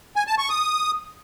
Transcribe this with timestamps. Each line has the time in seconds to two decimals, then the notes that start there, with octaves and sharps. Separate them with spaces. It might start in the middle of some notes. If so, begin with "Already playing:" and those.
0.16 G#5
0.27 A5
0.38 C#6
0.50 D#6